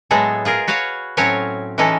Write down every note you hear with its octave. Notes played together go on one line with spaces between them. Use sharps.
A2 F#3 G#3 B3 G#4 A4
F4 G#4 A#4
F#4 B4 C#5 F5 F#5
A2 F#3 C4 C#4 C#5 G#5
E3 G#3 C#4 D#4 A4